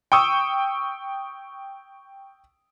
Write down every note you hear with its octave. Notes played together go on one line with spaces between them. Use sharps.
G5 C#6 D#6 E6